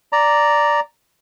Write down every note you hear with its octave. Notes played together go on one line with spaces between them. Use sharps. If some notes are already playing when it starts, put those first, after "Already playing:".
D5 A#5